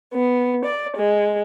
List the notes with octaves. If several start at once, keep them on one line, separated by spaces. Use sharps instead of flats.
B3
D5
G#3